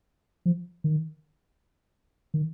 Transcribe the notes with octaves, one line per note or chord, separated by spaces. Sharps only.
F3
D#3
D#3